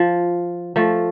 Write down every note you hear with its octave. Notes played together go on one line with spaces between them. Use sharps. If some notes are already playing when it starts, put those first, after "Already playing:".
Already playing: F3
F3 A3